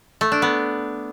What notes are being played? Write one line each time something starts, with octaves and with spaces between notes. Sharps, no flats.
A3
D4
B3